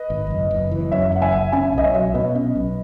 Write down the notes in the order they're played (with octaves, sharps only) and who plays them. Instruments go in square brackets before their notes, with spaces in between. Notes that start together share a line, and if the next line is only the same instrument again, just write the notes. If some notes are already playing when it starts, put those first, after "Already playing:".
Already playing: [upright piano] B4 D#5
[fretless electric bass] G#1
F#1
F#1
E3
[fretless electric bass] F#2 [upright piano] C#5 E5
[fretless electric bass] F#1 [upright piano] F#5
[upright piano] E5 G#5
[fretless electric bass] F#1
[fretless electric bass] C#4 [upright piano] E5 G#5
[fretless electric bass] B1 [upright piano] D#5
[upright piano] C#5 E5
[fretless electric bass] F#3
[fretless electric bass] B2 [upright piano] B4 D#5
[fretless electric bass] C#4
B1